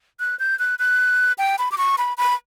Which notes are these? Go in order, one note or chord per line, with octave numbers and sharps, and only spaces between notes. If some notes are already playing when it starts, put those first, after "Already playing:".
F#6
G6
F#6
F#6
G5
B5
D6
C#6
B5
B5